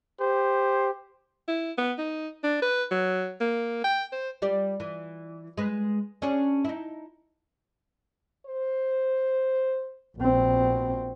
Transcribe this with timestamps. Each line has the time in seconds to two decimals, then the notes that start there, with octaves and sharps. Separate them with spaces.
0.19 G4 C5
1.48 E4
1.78 B3
1.98 D#4
2.43 D4
2.62 B4
2.91 F#3
3.41 A#3
3.84 G5
4.12 C5
4.42 G3 G4 D5
4.80 E3
5.57 G#3 B4
6.22 C#4 D4 G#4
6.65 D#4 E4
8.46 C5
10.18 A#1 B2 C4